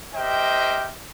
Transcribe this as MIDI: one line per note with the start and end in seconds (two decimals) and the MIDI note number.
0.15 0.91 67
0.15 0.91 70
0.15 0.91 72
0.15 0.91 75
0.15 0.91 76
0.15 0.91 79